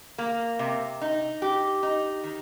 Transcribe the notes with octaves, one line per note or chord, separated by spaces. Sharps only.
A#3
C3
D#4
G4
D#4
D#3